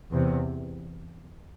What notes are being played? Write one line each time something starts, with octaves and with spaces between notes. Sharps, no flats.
E2 C3